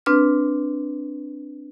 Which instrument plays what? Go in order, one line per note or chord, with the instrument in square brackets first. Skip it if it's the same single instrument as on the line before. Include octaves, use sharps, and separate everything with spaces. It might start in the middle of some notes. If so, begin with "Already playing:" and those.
[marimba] C4 D4 B4 F6